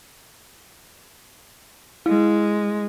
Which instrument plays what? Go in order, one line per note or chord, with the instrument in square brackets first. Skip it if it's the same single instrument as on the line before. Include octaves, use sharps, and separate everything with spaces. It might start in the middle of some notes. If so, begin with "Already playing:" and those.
[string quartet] G#3 [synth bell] E4